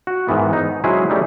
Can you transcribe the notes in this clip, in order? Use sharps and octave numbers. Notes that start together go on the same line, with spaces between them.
F#4
G#2 D#3 E3 B3
D#4
F#3 G#3 C#4 E4 G#4 C5
G3 A3 C#4 D#4